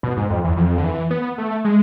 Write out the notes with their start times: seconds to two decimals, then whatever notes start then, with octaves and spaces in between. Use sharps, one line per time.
0.03 B2
0.17 G#2
0.30 F2
0.44 E2
0.57 F2
0.78 D3
0.84 E3
1.11 B3
1.38 A3
1.65 G#3